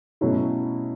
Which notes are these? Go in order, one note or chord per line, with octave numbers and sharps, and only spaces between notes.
B2 F#3 A3 C#4 E4